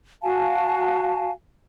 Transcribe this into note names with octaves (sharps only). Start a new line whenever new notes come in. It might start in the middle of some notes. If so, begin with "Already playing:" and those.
F#4 F5 G#5 A5